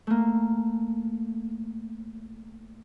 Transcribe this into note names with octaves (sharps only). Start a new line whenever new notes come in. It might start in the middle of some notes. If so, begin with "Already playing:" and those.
A3 A#3